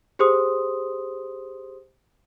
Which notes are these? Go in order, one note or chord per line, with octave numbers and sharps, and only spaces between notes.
G4 G#4 C5 C6 D#6